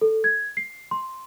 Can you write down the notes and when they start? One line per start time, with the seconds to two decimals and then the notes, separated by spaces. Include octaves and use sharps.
0.01 A4
0.24 G#6
0.57 C7
0.91 C6